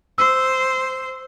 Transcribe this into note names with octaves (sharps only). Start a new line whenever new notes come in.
C5 E6